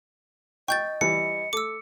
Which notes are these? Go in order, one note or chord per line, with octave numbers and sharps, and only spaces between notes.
D#5 G5 C#6 G6 A6
E3 G3 C#7
A3 D6 E6